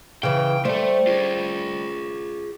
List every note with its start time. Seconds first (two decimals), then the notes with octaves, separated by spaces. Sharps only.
0.23 C#3 E3 G5
0.65 G3 A3 A4 C5
1.07 F4 G#4